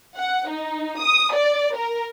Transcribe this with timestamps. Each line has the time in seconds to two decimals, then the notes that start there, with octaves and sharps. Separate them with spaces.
0.16 F#5
0.49 D#4
1.01 D#6
1.34 D5
1.76 A#4